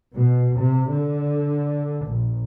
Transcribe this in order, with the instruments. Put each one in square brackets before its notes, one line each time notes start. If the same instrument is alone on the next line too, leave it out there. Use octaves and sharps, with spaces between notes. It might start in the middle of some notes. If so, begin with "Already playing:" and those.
[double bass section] B2
C3
D3
A#1